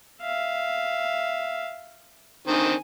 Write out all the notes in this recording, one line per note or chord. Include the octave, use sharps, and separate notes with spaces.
E5 F5
D3 D#3 C4 G#5